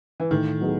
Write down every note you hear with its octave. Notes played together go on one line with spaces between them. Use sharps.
E3
A2 D#3
F#3 B3 D#4 G#4